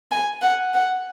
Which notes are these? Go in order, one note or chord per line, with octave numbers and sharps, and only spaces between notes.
G#5
F#5
F#5